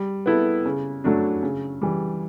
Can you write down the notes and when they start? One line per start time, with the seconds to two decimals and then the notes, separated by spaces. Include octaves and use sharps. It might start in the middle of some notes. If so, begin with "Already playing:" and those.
Already playing: G3
0.26 B3 E4 A4
0.65 C#3
1.04 F#3 A3 D4
1.42 C#3
1.82 E3 G3